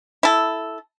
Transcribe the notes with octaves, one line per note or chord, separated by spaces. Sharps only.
E4 A4